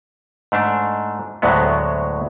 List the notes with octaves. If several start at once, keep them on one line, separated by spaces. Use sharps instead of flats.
G#2 A3 D4
D2 A2 F#3 G#3 B3